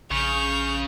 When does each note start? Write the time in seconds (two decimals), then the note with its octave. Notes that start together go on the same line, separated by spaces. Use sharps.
0.11 A#1 C#3 C#6 G6 F7